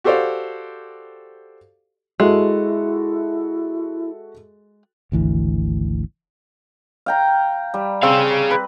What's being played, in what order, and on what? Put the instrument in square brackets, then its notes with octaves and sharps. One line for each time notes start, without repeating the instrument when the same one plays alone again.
[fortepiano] F#4 G4 A4 C5 D5 F5
[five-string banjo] G#3 [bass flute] E4 [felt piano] F#4 A4 E5
[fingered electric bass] G#1 D2 E3
[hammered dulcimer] F5 G5 A#5
G3
[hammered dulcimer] C4 [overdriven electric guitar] G#4 F5
[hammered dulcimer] B4